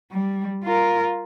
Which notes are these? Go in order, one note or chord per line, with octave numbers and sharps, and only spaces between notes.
G3
F4 A#4